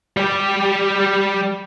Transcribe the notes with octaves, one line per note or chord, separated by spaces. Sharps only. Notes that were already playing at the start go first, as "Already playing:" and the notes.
G3 G4